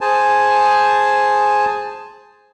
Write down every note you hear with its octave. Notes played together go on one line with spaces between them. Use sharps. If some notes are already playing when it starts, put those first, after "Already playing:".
G#4 C5 G#5 A5